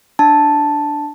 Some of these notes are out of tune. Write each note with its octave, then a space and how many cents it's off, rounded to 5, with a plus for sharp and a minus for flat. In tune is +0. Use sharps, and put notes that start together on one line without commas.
D4 +0 A5 +0